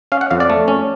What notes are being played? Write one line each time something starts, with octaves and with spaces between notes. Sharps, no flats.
C#4 F5
F#5
F2 F5
D5
A3
C#4